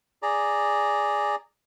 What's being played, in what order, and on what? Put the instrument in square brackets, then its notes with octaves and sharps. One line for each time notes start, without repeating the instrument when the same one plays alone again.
[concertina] G#4 D5 A#5